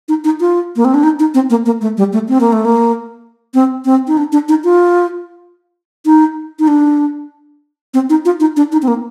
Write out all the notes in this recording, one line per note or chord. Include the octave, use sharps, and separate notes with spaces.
D#4
D#4
F4
A#3
C4
D4
D#4
D#4
C4
A#3
A#3
A3
G3
A3
C4
A#3
A3
A#3
C4
C4
D#4
D4
D4
D#4
F4
D#4
D#4
D4
C4
D#4
F4
D#4
D4
D#4
C4
A#3